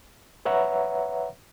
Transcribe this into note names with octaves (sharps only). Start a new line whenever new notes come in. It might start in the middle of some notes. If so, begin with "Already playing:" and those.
B4 C#5 E5 F#5 A#5